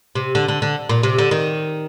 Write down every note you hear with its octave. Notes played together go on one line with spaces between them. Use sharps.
C3
D3
D3
D3
A#2
C3
D3
D#3